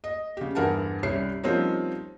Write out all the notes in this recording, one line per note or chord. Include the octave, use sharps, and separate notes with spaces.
D#5
C#3 G4
E2 G2 A#4 F#5 A5
C2 G3 C#4 C7
F3 G3 A#3 C4 C#4 D#4